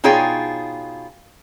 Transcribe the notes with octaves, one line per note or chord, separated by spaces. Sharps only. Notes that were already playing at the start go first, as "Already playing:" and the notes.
B2 D#4 F4 G#4 C#5 G5